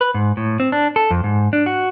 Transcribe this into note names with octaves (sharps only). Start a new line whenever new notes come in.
B4
G#2
A2
C4
D4
A4
F2
G#2
D4
F#4